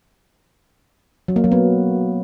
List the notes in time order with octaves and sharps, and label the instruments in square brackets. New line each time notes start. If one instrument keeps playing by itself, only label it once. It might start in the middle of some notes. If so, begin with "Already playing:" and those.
[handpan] F#3
A#3
F#3
B3